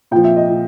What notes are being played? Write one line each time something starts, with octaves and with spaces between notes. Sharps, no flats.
A#2 F3 G5
E5
D#5
A#2